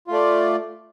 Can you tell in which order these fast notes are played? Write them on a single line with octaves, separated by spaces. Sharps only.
F4 A3 D5